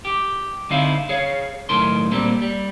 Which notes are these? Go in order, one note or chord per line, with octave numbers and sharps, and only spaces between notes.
G4
D3 C4 D#4 E4 F5
G#4 C#5 F5
B1 A2 D#3 C6
A#2 G3 A#3 C4
G3